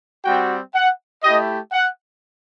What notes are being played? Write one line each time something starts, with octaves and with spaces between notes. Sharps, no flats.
G3 C4 F#4 G5
F#5
A3 E4 G4 D#5
F#5